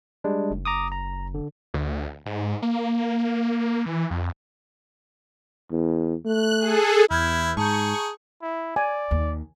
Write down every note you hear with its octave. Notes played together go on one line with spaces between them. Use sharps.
G3 G#3 D4
F#1
A#5 D6 D#6
A#5
D3
D2
G#2
A#3
E3
F2
E2
A3 F#6
G#4 A4
E2 E4 F6 G6 G#6
G#2 G#4 A5 A#5 C#6 G6
E4
D5 G#5
D#2